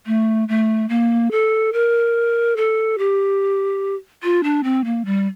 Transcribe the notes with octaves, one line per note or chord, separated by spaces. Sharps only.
A3
A3
A#3
A4
A#4
A4
G4
F4
D4
C4
A#3
G3